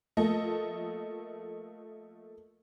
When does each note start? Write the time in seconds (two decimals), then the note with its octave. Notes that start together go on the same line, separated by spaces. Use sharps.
0.17 F3 A3 A#3 A4 D#5